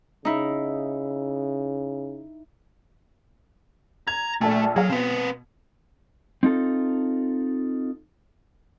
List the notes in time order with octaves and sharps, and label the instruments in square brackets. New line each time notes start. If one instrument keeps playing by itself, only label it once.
[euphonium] C#3 [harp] D#4 E4
[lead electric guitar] A#5 [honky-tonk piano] G#6
[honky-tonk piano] A#1 A4 D5 [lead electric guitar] A3
[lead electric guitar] F#3 [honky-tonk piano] G#4 F5
[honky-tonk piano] B2 [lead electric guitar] C4 B4
[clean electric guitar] C4 D#4 F4 A4